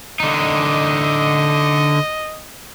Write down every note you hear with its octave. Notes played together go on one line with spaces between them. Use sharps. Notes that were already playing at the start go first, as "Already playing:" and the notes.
D3 D#4 D#5